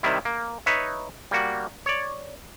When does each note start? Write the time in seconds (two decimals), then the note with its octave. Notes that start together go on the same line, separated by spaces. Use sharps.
0.03 C3 D#3 G3 E4
0.25 A#3
0.66 D#4 B4 C#5 E5
1.31 G3 A#3 F#4
1.86 C#5 D5